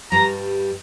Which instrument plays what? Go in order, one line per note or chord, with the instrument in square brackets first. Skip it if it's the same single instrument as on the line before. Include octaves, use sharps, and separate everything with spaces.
[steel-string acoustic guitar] G2 G3 [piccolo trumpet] A#5